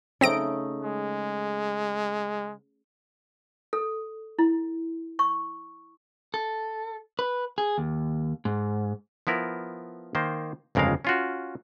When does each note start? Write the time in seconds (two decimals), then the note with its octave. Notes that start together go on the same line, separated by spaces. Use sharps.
0.21 C#3 A3 C4 D#4 A#6 D7
0.83 G#3
3.73 A4
4.39 E4
5.19 C#6
6.34 A4
7.19 B4
7.58 G#4
7.78 D#2
8.45 G#2
9.27 F3 B3 E4 A#4
10.15 D#3 A#3 C5
10.75 G1 F2 C#3 G#3 A#4 F5
11.05 C#4 F4 F#4